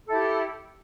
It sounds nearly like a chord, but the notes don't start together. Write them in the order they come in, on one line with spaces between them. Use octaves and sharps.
A4 E4 G4